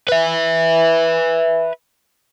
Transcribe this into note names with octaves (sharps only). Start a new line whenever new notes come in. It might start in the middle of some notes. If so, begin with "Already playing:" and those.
B4 E5